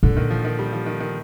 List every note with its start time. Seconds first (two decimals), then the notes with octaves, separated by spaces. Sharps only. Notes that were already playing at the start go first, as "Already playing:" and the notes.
0.03 A#2 D3
0.17 D#3
0.30 F3
0.45 D#3
0.59 G3
0.73 F3
0.86 D#3
1.00 D#3